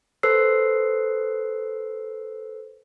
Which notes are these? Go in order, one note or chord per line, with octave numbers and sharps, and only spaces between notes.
A4 B4 C5 E6 C7